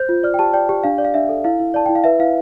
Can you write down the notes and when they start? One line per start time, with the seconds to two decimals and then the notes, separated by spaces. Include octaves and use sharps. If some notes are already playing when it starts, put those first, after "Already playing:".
Already playing: C5 G6
0.09 F4
0.23 D5 F6
0.34 G5
0.39 G4 A5
0.53 D5 G5
0.69 G4
0.84 D4 F5
0.98 D5
1.05 F5
1.14 D4 E5
1.29 A4
1.44 E4 F5
1.60 E4
1.74 D5 A5
1.86 E4 G5
1.95 F5
2.04 B4 E5
2.19 E4 F5